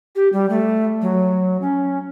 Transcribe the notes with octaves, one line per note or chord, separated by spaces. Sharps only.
G4
G3
A3
F#3
C#4